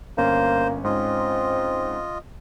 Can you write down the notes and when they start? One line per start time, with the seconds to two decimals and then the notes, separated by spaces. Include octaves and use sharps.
0.18 G1 A#3 C#4 C5
0.84 G#2 C4 C#4 F4 D#5